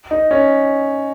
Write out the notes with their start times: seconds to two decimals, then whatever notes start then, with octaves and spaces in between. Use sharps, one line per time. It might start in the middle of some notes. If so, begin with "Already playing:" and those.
0.11 D#4
0.31 C#4